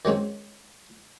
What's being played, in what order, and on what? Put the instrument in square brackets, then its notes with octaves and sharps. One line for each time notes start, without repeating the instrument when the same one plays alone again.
[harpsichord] D#3 F#3 G#3 C4 C#4